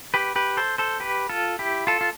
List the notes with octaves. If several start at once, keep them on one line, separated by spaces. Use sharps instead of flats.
G4 B4
G4 B4
A4 C5
A4 C5
G4 B4
F4 A4
E4 G4
F4 A4
F4